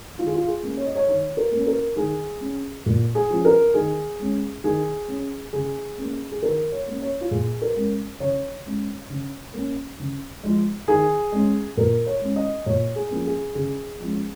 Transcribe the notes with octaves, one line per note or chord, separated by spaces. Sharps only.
D#3 F4
G#4
F4
G#4
A#3 C#4
C#5
D#5
C#5
D#3 C#5
A#4
A#3 C#4
A#4
D#3 G#4
C#4
A#2
G#4
F3 C#4
A#4
D#3 G#4
G#3 C#4
D#3 G#4
C#4
C#3 G#4
A#3 C#4
G#4
D#3 A#4
C#5
A#3 C#4
C#5
F4
A#2 G#4
A#4
G#3 C#4
C#3 C#5
G#3 C#4
C#3
A#3 C#4
C#3
F3 G#3
D#3 G#4
G#3 C#4
A#2 A#4
C#5
G#3 C#4
D#5
A#2 C#5
G#4
F3 A#3 C#4
G#4
C#3 G#4
F3 G#3 C#4